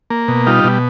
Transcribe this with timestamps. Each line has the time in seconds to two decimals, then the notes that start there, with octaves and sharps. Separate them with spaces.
0.10 A#3
0.28 B2
0.46 G3 D#4 F4
0.64 B2